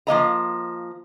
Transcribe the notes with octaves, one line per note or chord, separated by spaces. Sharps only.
F3 A#3 D#5 A#5